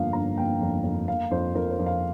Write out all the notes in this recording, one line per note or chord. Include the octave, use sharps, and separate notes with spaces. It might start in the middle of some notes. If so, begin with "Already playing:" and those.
Already playing: G1 F2 F3 A#3 F5
G1 A#5
A#3 G5
F2
F2
A#3 F5
F2 C5
F2 A#4
C5
F2
F5